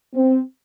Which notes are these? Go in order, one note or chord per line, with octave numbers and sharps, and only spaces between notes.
C4